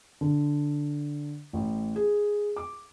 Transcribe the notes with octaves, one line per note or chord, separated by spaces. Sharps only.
D3
A1
G#4
D6